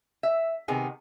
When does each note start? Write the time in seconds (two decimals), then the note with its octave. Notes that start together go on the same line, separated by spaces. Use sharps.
0.23 E5
0.68 C3 D#3 B3 G#4